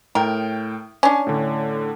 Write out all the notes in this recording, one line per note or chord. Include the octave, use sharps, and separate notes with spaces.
A2 A#4 G5
C#4 D4 G#5
A2 D3